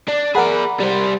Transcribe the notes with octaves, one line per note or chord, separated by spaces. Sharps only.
D4
G#4 A#4 D5 F#5 B5
G3 C5